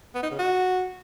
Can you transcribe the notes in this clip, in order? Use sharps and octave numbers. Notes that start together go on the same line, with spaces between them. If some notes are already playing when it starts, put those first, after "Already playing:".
B3
D#4
C#3
F#4